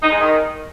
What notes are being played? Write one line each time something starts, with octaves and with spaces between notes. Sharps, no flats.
D#4
G#3
D#3